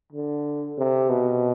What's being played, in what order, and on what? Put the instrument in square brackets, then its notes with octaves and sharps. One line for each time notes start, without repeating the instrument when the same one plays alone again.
[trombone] D3
C3
B2